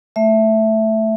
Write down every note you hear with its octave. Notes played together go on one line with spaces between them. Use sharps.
A3 E5